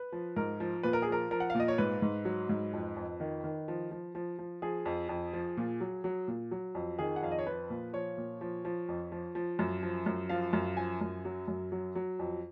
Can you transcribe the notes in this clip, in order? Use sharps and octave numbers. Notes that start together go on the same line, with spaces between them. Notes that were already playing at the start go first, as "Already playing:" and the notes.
Already playing: B4
F3
G#2 A#4
F3
A#2 B4
A#4
G#4
F3 A#4
F3 A#4
F#5
F5
A#2
D#5
C#5
G#2 B4
G#2
F#3
G#2
F2
F2
D#3
D#3
F3
F3
F3
F3
F3 G#4
F2
F2
F3
A#2
F#3
F#3
A#2
F#3
F2
D#3 G#4
F#5
F2 F5
D#5
C#5
F3 B4
A#2
F3 C#5
A#2
F3
F3
F2
F3
F3
F#2
F3
F#2
F3 F5
F#2
F3 G#5
F#2
F#3
F#2
F#3
F#3
F2